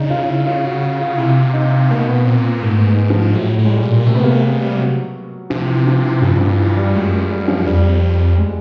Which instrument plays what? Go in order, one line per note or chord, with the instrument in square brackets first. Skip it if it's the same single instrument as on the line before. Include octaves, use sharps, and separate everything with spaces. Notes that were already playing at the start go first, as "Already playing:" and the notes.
Already playing: [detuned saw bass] C#3 [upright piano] D4 D#4
[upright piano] F4
E4
F4
F#4
F#4
F4
[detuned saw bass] C3 [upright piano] E4
[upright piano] D#4
[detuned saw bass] B2 [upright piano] A#3
[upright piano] B3
[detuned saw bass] A#2 [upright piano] C4
[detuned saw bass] G#2 [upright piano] A3
[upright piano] G#3
F3
[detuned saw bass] A2 [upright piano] F#3
[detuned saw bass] A2
[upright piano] G#3
G3
[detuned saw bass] A#2
[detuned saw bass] C3 [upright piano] A3
[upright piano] B3
A#3
G3
F#3
[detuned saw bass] C3 [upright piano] F3
[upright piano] E3
F3
E3
[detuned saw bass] G2 [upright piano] F3
[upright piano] F3
E3
G3
[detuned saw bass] F#2 [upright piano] G#3
[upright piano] G#3
G3
F3
[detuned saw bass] F2 [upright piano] G3
[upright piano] G#3